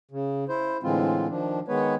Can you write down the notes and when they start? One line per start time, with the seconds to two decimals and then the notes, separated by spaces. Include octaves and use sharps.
0.11 C#3
0.49 E4 C5
0.83 A2 D3 E3 G#3 C4 F4
1.29 D#3 F3 D4
1.68 D#3 G#3 B3 B4 C#5